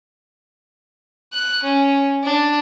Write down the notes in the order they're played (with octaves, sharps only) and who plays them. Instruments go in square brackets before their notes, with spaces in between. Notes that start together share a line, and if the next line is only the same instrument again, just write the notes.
[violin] F#6
C#4
D4